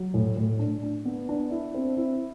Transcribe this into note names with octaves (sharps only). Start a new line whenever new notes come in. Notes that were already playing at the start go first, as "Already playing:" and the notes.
Already playing: F#3
A2
A2
D4
D4
B3
D4
E4
C4
E4